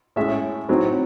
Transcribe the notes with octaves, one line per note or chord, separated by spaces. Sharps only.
A2 G#3 C#4 E5
A2 F#3 C4 D#4